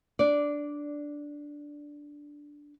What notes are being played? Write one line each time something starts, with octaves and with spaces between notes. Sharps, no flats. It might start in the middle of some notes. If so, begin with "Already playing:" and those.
D4 D5